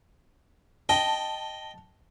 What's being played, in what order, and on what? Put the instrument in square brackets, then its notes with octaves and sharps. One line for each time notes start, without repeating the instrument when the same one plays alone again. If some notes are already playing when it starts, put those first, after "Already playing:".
[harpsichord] D#5 G5 [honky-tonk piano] A5